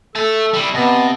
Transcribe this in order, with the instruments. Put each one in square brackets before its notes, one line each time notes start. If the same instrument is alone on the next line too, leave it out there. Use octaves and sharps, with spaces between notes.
[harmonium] A4 [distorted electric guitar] E5 A5
[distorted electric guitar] G3 E4
[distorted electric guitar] C3 [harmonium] B3 D#5 A5